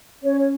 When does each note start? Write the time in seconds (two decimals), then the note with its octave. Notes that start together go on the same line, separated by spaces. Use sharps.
0.23 C#4 C#5
0.39 C#5